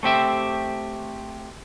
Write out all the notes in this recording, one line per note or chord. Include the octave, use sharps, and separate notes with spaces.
A3 C4 G4 E5